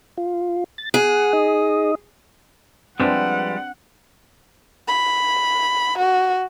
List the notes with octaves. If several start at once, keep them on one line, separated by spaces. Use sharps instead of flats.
F4
A6
G#4 F#5
D#4 D#5
F3 G3 G#3 C4 D4 B4 E5 F#5
B5
F#4